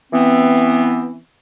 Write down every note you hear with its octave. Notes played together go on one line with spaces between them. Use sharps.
E3 B3 C4